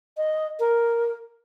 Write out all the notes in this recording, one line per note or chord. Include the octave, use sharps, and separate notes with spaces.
D#5
A#4